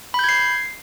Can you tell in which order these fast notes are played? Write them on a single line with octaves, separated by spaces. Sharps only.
B5 G6 G#6 C7